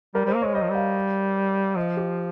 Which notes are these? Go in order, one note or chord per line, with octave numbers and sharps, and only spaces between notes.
G3 A#4
G3 C5
A#3
G#3 C#5
G3 D#5
F3
G3 F5
F3 D#5
G4